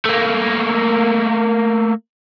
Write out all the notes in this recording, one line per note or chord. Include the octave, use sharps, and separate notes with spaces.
A3 A#3